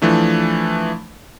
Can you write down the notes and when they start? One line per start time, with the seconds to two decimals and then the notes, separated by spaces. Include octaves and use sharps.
0.02 E3 F3 A3 D4